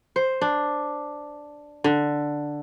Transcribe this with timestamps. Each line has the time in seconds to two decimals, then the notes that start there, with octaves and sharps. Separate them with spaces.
0.16 C5
0.42 D4
1.84 D3